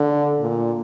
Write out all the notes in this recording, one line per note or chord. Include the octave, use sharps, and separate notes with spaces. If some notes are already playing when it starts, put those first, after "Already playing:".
Already playing: D3
A#2